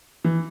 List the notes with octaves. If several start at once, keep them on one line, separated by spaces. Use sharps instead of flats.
E3